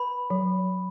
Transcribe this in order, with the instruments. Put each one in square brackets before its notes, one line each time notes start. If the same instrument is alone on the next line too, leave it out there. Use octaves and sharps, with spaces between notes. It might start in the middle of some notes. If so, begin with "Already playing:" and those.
Already playing: [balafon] B4 [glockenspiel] B5
[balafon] F#3